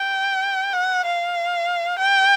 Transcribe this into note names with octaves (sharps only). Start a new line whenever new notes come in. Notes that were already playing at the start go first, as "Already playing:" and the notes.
Already playing: G5
F#5
F5
G5